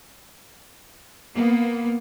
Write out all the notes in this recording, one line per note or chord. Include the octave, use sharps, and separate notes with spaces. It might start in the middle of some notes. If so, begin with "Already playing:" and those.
A#3 B3